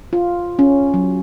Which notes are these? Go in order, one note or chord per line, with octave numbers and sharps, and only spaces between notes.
F4
C#4
F#3